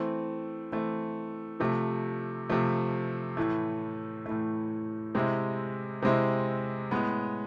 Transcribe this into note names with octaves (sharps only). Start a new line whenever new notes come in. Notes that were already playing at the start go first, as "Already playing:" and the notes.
Already playing: E3 A3 C4
E3 A3 C4
C3 F3 A3
C3 F3 A3
A2 E3 A3
A2 E3 A3
C3 G#3 C4 E4
C3 G#3 C4 E4
A2 G#3 B3